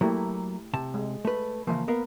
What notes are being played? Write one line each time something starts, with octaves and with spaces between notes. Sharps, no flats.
F#3 A3 A#3 E4 G4
C3 A5
G#3
A3 B4
C#3 E3 F3 A#3
B3 A#4 F5